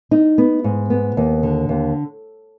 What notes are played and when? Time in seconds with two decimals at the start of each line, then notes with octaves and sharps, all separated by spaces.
0.11 D#4
0.38 B3
0.64 G#2
0.90 B3
1.17 D#2
1.43 D3
1.69 D#2